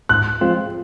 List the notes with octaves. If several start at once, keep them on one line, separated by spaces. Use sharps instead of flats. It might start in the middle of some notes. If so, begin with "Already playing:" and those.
G#2 F#6
F3 G#3 C4 F4